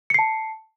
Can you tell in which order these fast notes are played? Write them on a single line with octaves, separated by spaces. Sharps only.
C#7 C7 A5